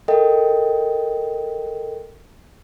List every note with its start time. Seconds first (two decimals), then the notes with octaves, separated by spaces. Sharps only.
0.08 A4 A#4 D#5 G5